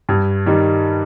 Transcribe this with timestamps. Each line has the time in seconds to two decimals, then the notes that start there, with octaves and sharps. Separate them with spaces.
0.09 G2
0.46 D#3 G3